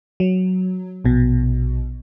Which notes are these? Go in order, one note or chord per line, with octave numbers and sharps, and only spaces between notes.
F#3
A#1 B2